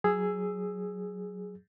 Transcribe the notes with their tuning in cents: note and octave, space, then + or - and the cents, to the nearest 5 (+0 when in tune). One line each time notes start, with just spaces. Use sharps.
F#3 +0 G#4 +0 E6 +10